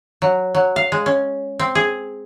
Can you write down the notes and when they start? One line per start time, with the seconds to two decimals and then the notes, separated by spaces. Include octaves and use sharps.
0.22 F#3
0.55 F#3
0.76 F5
0.92 G#3
1.06 C#4
1.59 C4
1.75 G#4